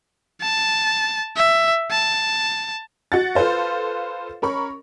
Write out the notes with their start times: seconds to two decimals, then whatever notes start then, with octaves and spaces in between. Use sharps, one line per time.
0.42 A5
1.37 E5
1.91 A5
3.12 F#4 F#5 A6
3.35 F4 A4 B4 C5 F5
4.42 C#4 A#4 B5 C#6